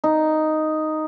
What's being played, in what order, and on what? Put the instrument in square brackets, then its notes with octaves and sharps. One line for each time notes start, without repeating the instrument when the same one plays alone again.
[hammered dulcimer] D#4